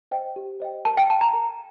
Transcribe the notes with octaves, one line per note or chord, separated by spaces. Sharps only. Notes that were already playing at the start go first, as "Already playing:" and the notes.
C5 D#5 G5
G4
C5 D#5 G5
A#4 A5
G5
F5 A5
A#5
A#4